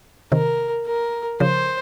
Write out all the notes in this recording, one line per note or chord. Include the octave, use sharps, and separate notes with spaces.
C3 D#3 A#4
A#4
C#3 F3 C5